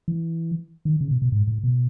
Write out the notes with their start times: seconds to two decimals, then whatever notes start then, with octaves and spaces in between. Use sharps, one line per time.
0.08 E3
0.85 D#3
1.01 C#3
1.11 B2
1.22 B2
1.32 G#2
1.47 A2
1.64 B2